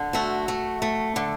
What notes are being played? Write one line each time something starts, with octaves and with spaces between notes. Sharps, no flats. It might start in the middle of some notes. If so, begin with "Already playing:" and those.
Already playing: D3
A3 F#4
A3
A3
D3